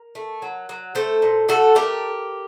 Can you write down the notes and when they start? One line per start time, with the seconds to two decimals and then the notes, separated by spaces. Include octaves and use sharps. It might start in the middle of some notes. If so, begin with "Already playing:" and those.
Already playing: A#4
0.15 A3
0.42 F#3
0.69 F#3
0.95 A3 A4 C5
1.22 A#2
1.48 A3 F#4 A4
1.75 A3 G4 A#4